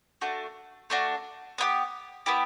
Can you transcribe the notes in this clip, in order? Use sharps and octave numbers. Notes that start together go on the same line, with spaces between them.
A3 D4 F#4
A3 D4 F#4
B3 E4 G4
B3 E4 G4